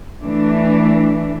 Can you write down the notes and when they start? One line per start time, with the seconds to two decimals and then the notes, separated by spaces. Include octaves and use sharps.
0.21 E3 A3 D4